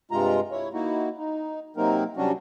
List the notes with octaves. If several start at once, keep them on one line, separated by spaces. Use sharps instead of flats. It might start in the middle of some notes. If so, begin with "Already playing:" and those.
G2 C3 G#3 F4 A#5
E4 C#5
A#3 D#4 E4 F#4
D#4
C3 F#3 A#3 C4 D#4 A#4
C3 F#3 G3 C#4 D4 F#4